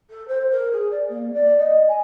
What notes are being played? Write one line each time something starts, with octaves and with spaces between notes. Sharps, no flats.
A4
C5
A#4
G#4
D5
A#3
D5
D#5
G#5